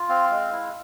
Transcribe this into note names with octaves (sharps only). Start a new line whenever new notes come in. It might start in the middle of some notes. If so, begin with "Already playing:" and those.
Already playing: F4
C4 F5
G#3
E4